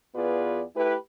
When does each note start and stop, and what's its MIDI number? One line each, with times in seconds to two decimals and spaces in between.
0.14 0.62 40
0.14 0.62 59
0.14 0.62 65
0.14 0.62 68
0.14 0.62 71
0.14 0.62 74
0.75 0.95 57
0.75 0.95 64
0.75 0.95 67
0.75 0.95 71